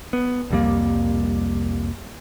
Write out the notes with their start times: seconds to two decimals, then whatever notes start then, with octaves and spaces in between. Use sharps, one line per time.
0.13 B3
0.50 C2 F2 G3 A#3